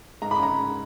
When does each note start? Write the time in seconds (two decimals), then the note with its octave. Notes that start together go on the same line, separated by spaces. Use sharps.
0.22 G#2 A#5
0.31 B5
0.39 C#4 A#5
0.58 G#2